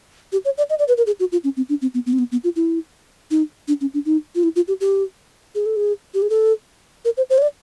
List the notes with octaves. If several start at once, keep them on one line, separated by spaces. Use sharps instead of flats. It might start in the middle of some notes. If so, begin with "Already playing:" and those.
G4
C#5
D5
D#5
D5
B4
A#4
G#4
F#4
F4
C#4
C4
D4
C4
B3
B3
C4
B3
B3
F4
E4
D#4
D4
C#4
D4
D#4
F4
E4
F4
G4
G4
G#4
A4
G#4
G4
G#4
A4
A#4
C5
C5
C#5
D5